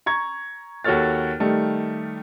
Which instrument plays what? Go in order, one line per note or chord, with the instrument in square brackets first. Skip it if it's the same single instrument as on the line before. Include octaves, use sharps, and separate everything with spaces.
[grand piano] A#5 C#6 G#6
D#2 F#4 A4 C#5 F6 A6
D#3 G3 A3